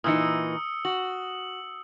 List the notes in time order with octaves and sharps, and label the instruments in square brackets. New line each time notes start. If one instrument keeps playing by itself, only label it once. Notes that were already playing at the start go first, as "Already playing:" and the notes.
[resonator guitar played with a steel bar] A#2 E3 D#4 [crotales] D#6 E6 C#7
[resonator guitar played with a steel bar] F#4 [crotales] F#7